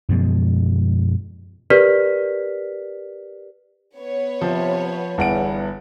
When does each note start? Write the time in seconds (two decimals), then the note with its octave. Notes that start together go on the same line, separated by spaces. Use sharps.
0.09 F#2 B2 F3 G#3
1.70 G4 A#4 B4 D5 F6 B6
3.97 B3 C#5
4.41 C3 F3
5.18 G1 E2 F#5 D7